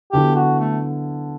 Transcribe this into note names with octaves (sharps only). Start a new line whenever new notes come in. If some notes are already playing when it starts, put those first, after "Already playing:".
D3 F#3 B3 E4 G4
F#4
A3